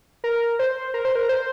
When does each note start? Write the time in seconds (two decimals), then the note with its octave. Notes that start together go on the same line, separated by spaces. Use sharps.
0.24 A#4
0.59 C5
0.94 A#4
1.05 C5
1.16 A#4
1.29 C5